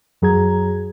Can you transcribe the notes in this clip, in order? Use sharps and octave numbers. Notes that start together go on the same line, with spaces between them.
F#2 F#3 G#4 A#5 G#6